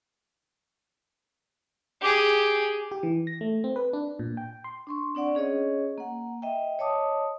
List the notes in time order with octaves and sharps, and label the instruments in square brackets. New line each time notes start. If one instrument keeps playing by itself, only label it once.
[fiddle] G4 G#4
[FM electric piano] G4
E3
A#6
A3
C4
B4
D4
A#2
G5
C6
[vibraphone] D4 C6 C#6
C4 D4 D5 F#5
C#4 G#4 C#5 D#5
A#3 F#5
D#5 E5 G5
C#5 D#5 A5 D6 D#6